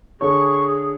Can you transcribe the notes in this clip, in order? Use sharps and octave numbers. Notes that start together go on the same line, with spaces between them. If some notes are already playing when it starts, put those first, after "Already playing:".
D3 G#4 A4 C#5 C#6